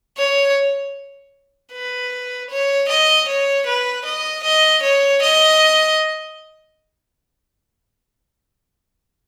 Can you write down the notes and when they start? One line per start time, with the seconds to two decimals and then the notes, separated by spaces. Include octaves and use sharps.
0.18 C#5
1.73 B4
2.50 C#5
2.89 D#5
3.29 C#5
3.67 B4
4.05 D#5
4.44 D#5
4.83 C#5
5.22 D#5